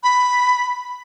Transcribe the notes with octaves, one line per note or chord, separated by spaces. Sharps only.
B5